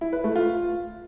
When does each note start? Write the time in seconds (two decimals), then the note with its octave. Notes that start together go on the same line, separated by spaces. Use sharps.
0.01 E4
0.13 B4
0.24 A3
0.36 F4